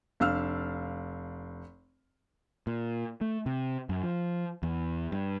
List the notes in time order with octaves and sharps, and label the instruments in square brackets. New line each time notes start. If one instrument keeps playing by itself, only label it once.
[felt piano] F1 D4 F5 E6 F6
[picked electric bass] A#2
A3
C3
F#2
F3
E2
G2